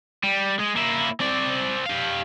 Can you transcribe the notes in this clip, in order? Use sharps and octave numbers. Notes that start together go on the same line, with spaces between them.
G3
G#3
A#3 E4
C4 D5
G4 F5